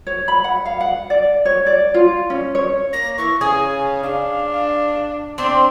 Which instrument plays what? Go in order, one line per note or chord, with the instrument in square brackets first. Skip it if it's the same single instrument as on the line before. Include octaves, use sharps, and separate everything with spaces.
[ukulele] C#5
B5
F#5
F5
F#5
D5
C#5
D5
F4
C#4
C#5
[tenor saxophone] A#3 [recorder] A#6
[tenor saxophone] E3 [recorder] C#6
[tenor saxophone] C#3 [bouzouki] G#4 [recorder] G#5
[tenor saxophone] D4 [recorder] F5
[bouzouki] C4 [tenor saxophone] D4 [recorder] C6